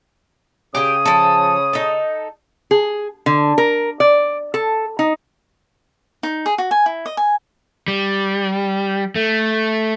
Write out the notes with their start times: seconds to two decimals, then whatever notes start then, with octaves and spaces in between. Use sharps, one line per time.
0.75 C#3 G4 G#4 G5 D#6
1.05 F3 A4
1.73 D#4 A4
2.71 G#4
3.26 D3
3.58 A#4
4.00 D5
4.54 A4
4.99 D#4
6.23 D#4
6.46 G#4
6.58 F#4
6.71 G#5
6.86 E4
7.06 D#5
7.17 G#5
7.88 G3
9.15 A3